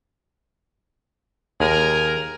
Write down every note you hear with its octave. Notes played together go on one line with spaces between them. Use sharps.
D#2 G#4 A#4